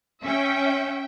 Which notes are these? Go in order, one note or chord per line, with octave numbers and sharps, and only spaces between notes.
C#4 E5 G5